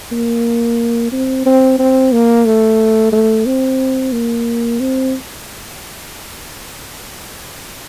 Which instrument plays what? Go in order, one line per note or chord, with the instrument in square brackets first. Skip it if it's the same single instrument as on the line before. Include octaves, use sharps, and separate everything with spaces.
[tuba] A#3
C4
C4
C4
A#3
A3
A3
C4
A#3
C4